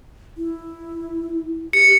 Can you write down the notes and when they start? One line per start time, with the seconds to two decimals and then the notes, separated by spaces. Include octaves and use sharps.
0.37 E4
1.73 G4 C#7